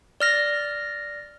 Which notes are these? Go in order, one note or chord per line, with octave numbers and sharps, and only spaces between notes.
D5 F6 A#6